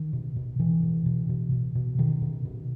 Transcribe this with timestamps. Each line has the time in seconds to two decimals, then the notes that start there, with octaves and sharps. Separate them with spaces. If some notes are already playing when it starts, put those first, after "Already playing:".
Already playing: D#3
0.13 B2
0.36 B2
0.59 B2 E3
0.83 B2
1.06 B2
1.29 B2
1.52 B2
1.75 B2
1.98 B2 D#3
2.22 B2
2.45 B2